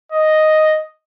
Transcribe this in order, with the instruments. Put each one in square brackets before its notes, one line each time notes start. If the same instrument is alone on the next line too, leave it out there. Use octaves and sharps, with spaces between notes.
[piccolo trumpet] D#5